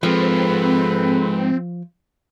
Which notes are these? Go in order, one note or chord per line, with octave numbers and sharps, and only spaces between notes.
G#2 F3 C4 G#4 A4 B4